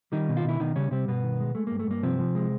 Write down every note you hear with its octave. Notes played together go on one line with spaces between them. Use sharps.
D#3 G3 D#4
B2
F4
B2 E4
B2 D#3 D#4
C#3 G3 C#4
C3 G3 C4
G2 B2 B3
D#3
G#3
G#3 A3
G2 A#3
A3
G2 A#3
C3 F3 C4
F3
G#3